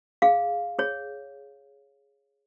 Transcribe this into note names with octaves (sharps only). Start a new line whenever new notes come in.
G#4 F5
G#4 C#5